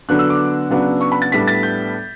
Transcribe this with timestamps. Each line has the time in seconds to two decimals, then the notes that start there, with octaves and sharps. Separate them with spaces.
0.09 D3 F#3 B3 D4 F#6
0.19 E6
0.30 D6
0.70 C#3 F#3 B3 D4
1.01 C#6
1.12 B5
1.22 A6
1.32 A2 G3 B3 D4 B6
1.48 A6
1.63 G6